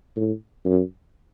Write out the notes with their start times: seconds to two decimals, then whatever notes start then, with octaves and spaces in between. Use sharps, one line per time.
0.17 A2
0.66 F#2